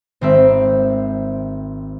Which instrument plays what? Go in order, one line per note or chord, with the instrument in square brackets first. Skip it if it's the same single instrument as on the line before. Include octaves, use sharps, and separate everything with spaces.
[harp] G#1 C4 E5